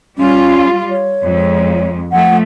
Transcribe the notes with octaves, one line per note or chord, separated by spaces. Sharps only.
G3 C#4 F4
C#5
F2 G#3
F3 A3 F#5